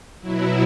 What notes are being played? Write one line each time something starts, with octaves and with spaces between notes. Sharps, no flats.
B2 F#3 E4